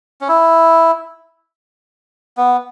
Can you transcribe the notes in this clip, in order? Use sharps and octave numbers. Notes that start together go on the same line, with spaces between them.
C#4
E4
B3